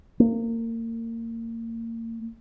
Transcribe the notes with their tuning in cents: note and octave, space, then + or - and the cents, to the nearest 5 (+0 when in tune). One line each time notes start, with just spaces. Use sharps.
A#3 -30